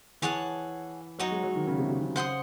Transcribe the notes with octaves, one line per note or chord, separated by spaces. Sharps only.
E3 G#4 C#5 F#5 A5
F#3 D#4 F#4 C#5
G#3
F#3
D#3
C#3
C3
C3
C#3
C5 F#5 C6 D#6